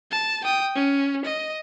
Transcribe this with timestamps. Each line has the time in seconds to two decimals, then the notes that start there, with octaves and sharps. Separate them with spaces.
0.12 A5
0.45 G5 D#6
0.75 C#4
1.25 D#5